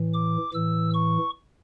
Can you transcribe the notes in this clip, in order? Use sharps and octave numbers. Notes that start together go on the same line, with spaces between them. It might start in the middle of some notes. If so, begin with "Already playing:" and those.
Already playing: A2 E3
D6
A2 E3 E6
C#6